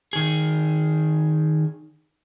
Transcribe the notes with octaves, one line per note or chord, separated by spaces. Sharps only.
D#3 G#4